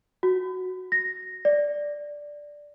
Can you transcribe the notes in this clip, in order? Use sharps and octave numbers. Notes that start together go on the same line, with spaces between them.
F#4
A#6
D5